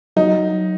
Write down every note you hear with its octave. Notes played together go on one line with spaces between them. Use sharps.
F#3 D#4